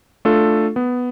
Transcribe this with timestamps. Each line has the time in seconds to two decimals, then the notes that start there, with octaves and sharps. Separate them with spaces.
0.25 A3 D4 F4 A4
0.76 B3